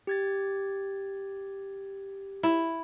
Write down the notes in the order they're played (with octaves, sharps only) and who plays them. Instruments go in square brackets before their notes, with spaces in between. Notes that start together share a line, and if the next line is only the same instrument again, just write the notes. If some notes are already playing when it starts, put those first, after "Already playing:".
[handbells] G4 G#6 A6
[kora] E4